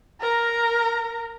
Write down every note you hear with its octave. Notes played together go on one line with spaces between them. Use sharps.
A#4 A#5